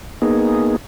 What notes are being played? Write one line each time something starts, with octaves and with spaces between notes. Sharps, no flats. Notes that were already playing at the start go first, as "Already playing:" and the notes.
A#3 B3 D#4 G#4